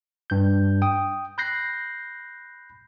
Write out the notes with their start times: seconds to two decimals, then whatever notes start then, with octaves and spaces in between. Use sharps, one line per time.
0.30 G2 G6
0.82 G5 D#6
1.38 B5 F#6 G6 A#6 C7